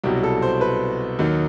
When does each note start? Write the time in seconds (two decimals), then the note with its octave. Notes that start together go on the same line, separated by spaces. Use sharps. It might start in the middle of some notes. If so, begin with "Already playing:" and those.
0.04 C2 B2 F#3 G4
0.23 A4
0.42 C5
0.61 B4
1.19 D#2 D#3 F#3